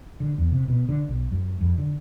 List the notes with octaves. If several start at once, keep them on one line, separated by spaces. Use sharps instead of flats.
D3
E2
C3
B2
D3
B1
F#2
F2
D3